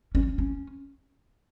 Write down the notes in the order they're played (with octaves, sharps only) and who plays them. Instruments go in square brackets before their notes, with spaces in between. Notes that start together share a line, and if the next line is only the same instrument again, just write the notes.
[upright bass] C#4
C#4